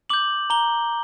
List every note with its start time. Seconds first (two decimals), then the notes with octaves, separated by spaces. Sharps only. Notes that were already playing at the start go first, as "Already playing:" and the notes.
0.10 D6 G6 F#7
0.50 A#5 G7